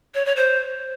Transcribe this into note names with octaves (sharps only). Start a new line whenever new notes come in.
C#5
C#5
C5